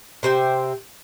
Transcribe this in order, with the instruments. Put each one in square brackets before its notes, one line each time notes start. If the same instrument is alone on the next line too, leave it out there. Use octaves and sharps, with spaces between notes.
[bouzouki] C3 C5 E5 G5